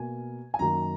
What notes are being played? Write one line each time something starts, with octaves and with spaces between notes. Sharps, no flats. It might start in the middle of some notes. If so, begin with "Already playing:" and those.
Already playing: B2 A#3 G#5
G#5
F#2 D#3 F#3 A#3 A#5